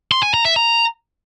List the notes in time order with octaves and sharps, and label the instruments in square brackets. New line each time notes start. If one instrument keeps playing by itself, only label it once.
[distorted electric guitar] C6
G#5
A#5
E5
A#5